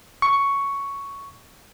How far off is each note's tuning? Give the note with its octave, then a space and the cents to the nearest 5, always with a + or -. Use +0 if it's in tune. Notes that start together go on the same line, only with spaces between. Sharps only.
C#6 +5